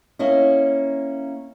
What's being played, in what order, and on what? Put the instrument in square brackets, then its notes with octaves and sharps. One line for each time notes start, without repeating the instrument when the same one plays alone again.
[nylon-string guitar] A#3 C#4 E4 D#5